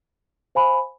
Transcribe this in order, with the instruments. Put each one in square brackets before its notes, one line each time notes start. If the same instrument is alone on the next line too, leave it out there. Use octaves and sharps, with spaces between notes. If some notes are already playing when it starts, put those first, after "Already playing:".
[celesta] C5 F5 G#5 B5